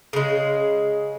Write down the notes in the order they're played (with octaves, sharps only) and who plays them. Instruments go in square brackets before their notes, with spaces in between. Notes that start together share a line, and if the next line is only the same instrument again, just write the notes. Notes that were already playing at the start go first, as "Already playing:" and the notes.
[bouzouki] C#3 G#3